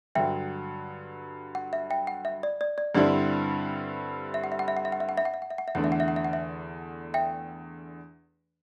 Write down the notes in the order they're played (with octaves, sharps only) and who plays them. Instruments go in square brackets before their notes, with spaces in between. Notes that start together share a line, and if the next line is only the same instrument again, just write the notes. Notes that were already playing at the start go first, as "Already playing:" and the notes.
[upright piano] G2 D3 F#3 [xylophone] E5 G5
[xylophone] F#5
E5
E5 G5
F#5
E5
D5
D5
D5
[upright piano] G2 D3 G3 C4 E4 [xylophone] D5
[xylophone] E5
F#5
E5
F#5
E5
F#5
E5
F#5
E5
F#5
E5
F#5
E5
F#5
E5
F#5
E5
[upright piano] E2 D3 A3 D4 [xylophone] F#5
[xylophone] E5
F#5
E5
F#5
E5
F#5
E5
E5 G5